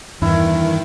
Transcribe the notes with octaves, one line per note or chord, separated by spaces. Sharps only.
E2 G2 D#3 E3 E4